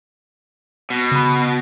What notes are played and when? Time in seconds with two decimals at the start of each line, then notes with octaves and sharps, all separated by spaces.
0.90 B2
1.12 C#3 B5